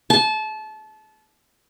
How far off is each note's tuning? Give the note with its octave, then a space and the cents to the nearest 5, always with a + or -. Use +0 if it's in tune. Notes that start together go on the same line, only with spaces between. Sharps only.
A5 -25